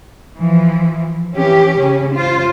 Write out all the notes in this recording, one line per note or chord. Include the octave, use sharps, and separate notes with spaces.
E3 F3
E3 C#4 G4
C#3 C#4
F4 C5